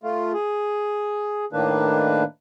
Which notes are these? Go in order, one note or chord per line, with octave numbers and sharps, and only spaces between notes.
A3 F4
G#4
A2 D#3 A#3 D4 B4